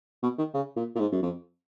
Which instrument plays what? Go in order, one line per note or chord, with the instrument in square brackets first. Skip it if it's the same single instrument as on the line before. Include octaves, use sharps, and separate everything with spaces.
[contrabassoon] B2
D#3
C#3
A#2
A#2
G#2
F#2
F2